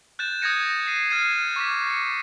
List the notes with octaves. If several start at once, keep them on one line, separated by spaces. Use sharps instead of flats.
F#6 G6 A6 E7
D#6 G6 G#6 A#6 C#7 D#7
D#6 C7 D#7
F6 G#6 A6 C7 D#7 E7
C#6 D6 B6
A6 C#7